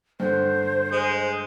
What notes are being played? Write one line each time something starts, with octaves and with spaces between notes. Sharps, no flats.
G2 D3 C5
G#3